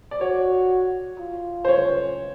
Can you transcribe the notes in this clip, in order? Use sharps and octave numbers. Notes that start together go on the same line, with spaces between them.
D5
F#4 C#5
F4
C5
C#5